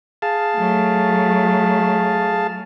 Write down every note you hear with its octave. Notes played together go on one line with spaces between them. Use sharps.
G#4 F5 A5
F#3 A3